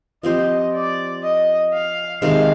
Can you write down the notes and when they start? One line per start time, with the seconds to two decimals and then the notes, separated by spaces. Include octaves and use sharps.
0.23 F3 C4 G4 C5 D#5
0.74 D5
1.23 D#5
1.73 F5
2.22 C3 D#3 G#3 F5